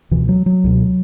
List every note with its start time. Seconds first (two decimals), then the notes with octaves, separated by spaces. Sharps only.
0.11 C#2 B2 E3
0.29 F#3
0.46 F#3
0.64 C#2 B2